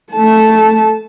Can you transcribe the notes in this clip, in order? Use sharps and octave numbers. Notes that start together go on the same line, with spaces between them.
A3 A5